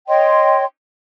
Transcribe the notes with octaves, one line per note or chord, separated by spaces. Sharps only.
C#5 D#5 G5 C6